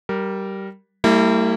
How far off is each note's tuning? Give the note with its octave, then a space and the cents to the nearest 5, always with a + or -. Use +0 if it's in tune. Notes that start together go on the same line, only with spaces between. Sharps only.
G3 -15 A#4 +0
G3 +0 A#3 -45 E4 -10